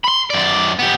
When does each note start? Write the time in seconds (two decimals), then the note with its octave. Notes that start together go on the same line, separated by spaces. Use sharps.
0.04 B5 C6
0.30 F#2 D5
0.79 B3 G4